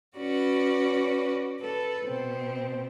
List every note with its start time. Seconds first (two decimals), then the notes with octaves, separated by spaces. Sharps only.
0.18 C#4 F#4 B4 D5
1.59 A4 B4
2.06 B2 C4